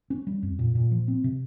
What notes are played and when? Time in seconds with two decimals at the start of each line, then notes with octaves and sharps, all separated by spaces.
0.10 C#4
0.27 G3
0.43 F2
0.59 A#2
0.75 A#2
0.91 F3
1.08 C4
1.24 C3